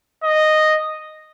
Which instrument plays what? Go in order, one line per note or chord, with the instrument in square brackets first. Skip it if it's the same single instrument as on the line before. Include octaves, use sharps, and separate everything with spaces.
[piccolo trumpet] D#5